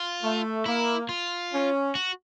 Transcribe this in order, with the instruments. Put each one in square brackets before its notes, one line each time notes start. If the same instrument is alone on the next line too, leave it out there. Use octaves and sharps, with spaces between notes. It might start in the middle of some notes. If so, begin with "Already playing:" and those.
Already playing: [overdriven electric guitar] F4
[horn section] A3
[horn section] A#3 [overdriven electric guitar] E4
[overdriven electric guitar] F4
[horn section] C#4
[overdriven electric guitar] F#4